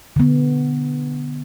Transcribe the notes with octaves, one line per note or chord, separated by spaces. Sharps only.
D3 B3